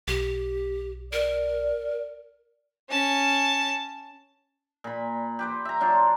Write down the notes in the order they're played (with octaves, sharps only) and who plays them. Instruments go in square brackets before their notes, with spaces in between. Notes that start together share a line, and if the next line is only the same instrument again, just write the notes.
[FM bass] B1 [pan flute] G4
[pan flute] A#4 [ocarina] D5
[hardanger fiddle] C#4 A5
[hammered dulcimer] A#2 B5
G4 B4 C5
E5 A#5
F#3 D4 F4 C5